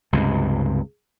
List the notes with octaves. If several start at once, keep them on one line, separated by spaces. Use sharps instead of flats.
C#2 G2 C3